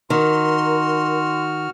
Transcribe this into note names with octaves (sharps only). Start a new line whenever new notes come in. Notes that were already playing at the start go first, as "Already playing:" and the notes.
D#3 F#4 A#4 C6 F6